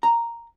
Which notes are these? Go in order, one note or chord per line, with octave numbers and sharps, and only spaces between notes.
A#5